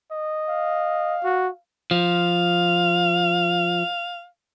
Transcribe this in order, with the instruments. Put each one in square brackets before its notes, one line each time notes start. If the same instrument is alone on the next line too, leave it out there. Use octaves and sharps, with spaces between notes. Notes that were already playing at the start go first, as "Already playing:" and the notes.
[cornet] D#5
[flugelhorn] F5
[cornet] F#4
[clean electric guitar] F3 [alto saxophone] F5